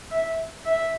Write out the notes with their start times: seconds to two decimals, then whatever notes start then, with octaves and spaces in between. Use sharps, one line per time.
0.11 E5
0.65 E5